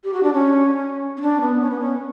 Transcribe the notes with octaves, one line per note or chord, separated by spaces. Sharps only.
G4
F#4
D4
C#4
C#4
D4
B3
C#4
B3
C#4